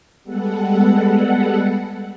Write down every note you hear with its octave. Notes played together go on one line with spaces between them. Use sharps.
G3 G#3 B3 A4 F#5